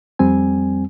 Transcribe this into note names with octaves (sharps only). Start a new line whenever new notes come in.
F2 G3 C4 G#5